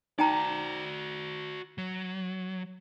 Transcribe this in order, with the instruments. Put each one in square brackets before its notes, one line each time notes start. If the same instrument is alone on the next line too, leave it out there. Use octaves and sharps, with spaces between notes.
[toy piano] D#4 G5 A#5 [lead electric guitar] F#4 D5
[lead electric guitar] F#3